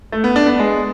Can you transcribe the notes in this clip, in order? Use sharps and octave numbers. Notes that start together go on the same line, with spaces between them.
A3
B3
D4
B3
G#3